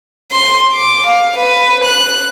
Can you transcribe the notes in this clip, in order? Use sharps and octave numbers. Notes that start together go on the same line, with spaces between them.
C6
D6
F5
B4
F#6